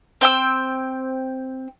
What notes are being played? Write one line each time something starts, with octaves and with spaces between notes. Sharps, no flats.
C4 G5 E6